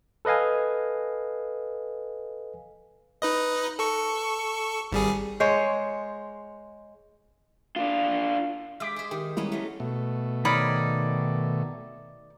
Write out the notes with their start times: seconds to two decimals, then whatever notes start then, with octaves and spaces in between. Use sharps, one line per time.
0.25 A4 B4 D#5 F5 G#5
3.22 D#4 B4 D#5
3.79 A4 C#6
4.92 G#1 G3 G#4
5.40 G#3 C5 C#5
7.76 D4 F4
8.80 G#3 G4 E5 D6 B6
8.96 G#4 C5
9.11 D#3 G4
9.37 G3 G#3 A#3 B3 C#4 E4
9.52 F#3 A3
9.80 B2 A3
10.45 D#3 D#4 C#5 D5 B5 F6